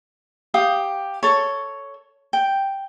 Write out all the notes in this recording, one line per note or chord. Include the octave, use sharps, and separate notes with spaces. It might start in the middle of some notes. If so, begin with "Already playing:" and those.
G4 F5 G5 D#6
A4 C#5
G5